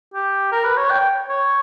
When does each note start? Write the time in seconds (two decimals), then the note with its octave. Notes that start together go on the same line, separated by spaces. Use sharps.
0.14 G4
0.52 A#4
0.64 B4
0.77 C#5
0.91 G5
1.29 C#5